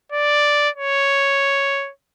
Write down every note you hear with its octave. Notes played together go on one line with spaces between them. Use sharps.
D5
C#5